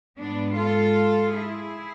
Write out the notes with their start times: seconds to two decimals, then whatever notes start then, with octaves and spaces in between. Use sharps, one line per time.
0.19 G#2 G#3 B3 D4
0.57 F4 A4
1.36 E4 G#4